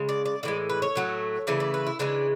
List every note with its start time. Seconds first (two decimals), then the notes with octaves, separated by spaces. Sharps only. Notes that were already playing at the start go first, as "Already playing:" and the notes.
Already playing: C#3 G#3
0.09 D5
0.26 D5
0.43 A2 E3 G#3 D5
0.70 B4
0.82 C#5
0.95 A2 F#3 A3
1.47 C#3 E3 A3 D5
1.60 D5
1.74 B4
1.87 E4
1.99 C#3 E3 G#3 D4